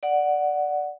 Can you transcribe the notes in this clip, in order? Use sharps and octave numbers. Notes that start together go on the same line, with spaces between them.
D5 F#5